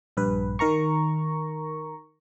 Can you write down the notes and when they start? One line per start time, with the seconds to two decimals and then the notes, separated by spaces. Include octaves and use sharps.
0.17 A#1 G2 B4
0.59 D#3 A#4 A#5 C#6